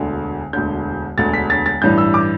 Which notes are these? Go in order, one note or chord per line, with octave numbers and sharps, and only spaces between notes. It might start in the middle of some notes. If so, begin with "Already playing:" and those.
Already playing: E1 D2 D3
E1 D2 D3 G6
E1 D2 D3 A6
B6
A6
A6
A1 G2 E3 G3 G6
E6
D6